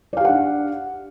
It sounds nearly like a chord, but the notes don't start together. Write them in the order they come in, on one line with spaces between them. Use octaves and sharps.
D5 F5 G4 F#5 D4